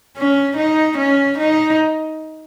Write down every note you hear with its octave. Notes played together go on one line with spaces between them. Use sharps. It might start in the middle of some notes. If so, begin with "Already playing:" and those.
C#4
D#4
C#4
D#4